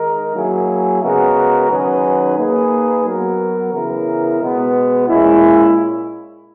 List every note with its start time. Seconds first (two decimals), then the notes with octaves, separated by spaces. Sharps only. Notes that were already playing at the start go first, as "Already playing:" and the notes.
Already playing: D#3 G#3 D#4 A#4
0.34 F#3 A#3 E4 G#4
1.02 C#3 G#3 B3 F#4 A#4
1.69 D#3 F#3 C#4 G#4 B4
2.36 A#3 D#4 G#4 B4
3.04 F#3 B3 F#4 A#4
3.72 C#3 E3 B3 E4 A#4
4.39 B2 G#3 B3
5.07 A#2 G#3 C#4 E4